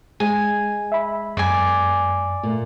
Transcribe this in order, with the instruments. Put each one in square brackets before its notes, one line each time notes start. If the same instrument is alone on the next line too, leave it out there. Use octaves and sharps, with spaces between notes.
[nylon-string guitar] G#3 [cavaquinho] G#5
[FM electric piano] E5 B5
[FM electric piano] F#2 [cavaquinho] D5 G#5
[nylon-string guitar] A#2 [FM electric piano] A3